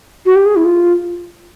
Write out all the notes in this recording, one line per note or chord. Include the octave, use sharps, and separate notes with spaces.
F#4
G4
G#4
E4
F4